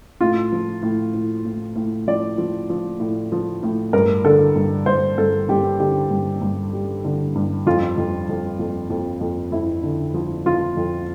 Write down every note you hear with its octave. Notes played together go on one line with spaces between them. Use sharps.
A2 F4
F3
A2
A2
A2
A2
F3 D5
F3
F3
A2
F3
A2
G2 A#4
D3 A4
G2
G2 C5
G2 A4
G2 G4
D3 G4
G2
G2
G3
D3
G2
F2 F4
F2
F2
F2
F2
F2
F2 E4
D3
F3
F3 F4
F2